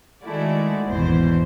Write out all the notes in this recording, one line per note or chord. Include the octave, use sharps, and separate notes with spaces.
D#3 G#3 A3 E4 F#4 D5
G#1 E2 B2 E3 C5